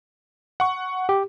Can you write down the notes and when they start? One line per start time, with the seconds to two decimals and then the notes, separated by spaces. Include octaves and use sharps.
0.60 F#5 C#6
1.09 G4